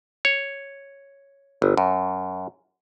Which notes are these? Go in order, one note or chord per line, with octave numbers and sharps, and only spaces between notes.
C#5
G1
F#2